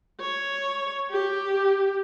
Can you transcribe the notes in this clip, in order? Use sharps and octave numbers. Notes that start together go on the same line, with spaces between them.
C#5
G4